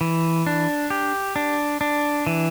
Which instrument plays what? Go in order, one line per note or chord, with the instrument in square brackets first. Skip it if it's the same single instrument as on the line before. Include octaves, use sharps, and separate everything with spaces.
[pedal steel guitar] E3
D4
G4
D4
D4
E3